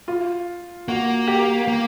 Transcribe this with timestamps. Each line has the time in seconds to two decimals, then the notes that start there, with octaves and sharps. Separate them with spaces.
0.08 F4
0.88 A#3 F#4
1.28 G4
1.68 A#3